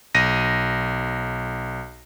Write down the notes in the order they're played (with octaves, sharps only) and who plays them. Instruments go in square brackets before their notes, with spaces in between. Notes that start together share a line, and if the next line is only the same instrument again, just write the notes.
[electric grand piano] B1 A#6 D#7